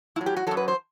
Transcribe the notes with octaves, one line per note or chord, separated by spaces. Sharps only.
A2 F#3 E4
G4
F#4
F#2 F#3 A4
B4
C5